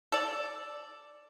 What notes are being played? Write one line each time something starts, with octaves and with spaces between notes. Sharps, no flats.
A4 D5